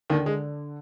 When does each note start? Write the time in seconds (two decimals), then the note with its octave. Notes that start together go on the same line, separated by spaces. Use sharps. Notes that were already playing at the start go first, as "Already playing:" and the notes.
0.10 D#2 D3 D#3
0.26 G#3